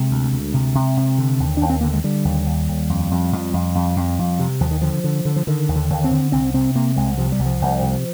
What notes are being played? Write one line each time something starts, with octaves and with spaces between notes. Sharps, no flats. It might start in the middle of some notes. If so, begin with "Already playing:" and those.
Already playing: C3 G#3
D2
D2
C3
C3
C3
D3
D#2
D#2 D4
C4
D3 A#3
G#3
D3 G3
D#2
D#2
D#2
F2
F2
F2
F2
F2
F2
F2
C3
D#2 F3
D#3
D3 F3
D3
D3
F3
D3 D#3
D#2
D3
D#2
C4
D3
C2 C4
C3 C4
C3 A#3
C2 G#3
C3 F3
G3
C2
F3
C2
C3